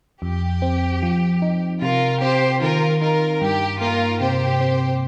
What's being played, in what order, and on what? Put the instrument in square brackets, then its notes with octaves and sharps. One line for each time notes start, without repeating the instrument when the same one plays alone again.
[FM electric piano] F2 [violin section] G4
[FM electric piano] C4
F3
D#4
[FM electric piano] C3 [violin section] F4 A#4
[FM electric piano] C4 [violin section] G4 C5
[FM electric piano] D#3 [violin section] F4 A#4
[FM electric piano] D#4 [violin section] F4 A#4
[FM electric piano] G2 [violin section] G4
[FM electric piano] A#3 [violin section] F4 A#4
[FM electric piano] C3 [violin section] G4 C5
[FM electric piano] C4